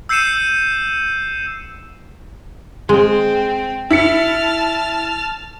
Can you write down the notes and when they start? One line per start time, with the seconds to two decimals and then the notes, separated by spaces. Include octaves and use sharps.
0.09 E6 G6 C7 C#7 D#7 E7
2.89 G#3 C4
3.91 E4 A5 F6 B6 C#7